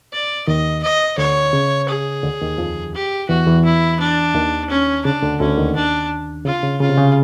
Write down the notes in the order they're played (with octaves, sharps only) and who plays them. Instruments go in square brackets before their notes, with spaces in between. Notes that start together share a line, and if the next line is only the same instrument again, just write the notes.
[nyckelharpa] D5
[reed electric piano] D#2 D#3 [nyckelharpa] D#5
[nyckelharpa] D#5
[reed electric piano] D2 D3 [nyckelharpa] C#5
[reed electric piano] C#3
[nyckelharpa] G#4
[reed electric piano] D2 D3
D#2 D#3
F2 F3
[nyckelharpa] G4
[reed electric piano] E2 E3 [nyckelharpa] F#4
[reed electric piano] E2 E3
[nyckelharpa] E4
D4
[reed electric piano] D#2 D#3
[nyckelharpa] C#4
[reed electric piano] C#3 [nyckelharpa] D4
[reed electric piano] D2 D3
[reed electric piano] D2 D3 [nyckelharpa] C#4
[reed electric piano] D#2 D#3
[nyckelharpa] D4
[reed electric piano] C#3 [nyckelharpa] F4
[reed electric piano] C#3
[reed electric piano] C#3 [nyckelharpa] F4
[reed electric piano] C3
C#3